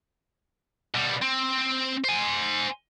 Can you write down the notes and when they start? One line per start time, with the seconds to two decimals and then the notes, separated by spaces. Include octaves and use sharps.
0.95 B2 G3
1.22 C4
2.04 C5 G#5